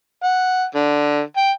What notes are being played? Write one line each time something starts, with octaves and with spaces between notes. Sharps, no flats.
F#5
D3
G5